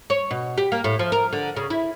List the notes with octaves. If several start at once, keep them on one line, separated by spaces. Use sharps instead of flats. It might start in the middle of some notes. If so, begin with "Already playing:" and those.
C#5
B2
G4
A#3
A2
F3
A#4
D3
C#3
E4